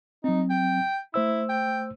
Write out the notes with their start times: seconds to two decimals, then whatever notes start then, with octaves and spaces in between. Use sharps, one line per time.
0.24 F#3 C4 D#4
0.50 G5
1.14 A3 E4 C5 E6
1.49 G5